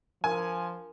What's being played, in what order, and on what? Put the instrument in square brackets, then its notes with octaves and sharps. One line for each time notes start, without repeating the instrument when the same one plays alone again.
[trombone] F3 [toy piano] D4 A#4 A#5 [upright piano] G#5